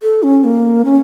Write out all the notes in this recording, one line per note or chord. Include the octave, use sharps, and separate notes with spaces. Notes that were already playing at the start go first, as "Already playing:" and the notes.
A4
C#4
A#3
C#4